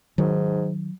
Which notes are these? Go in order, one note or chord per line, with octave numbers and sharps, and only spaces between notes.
G#2 D#3 F#3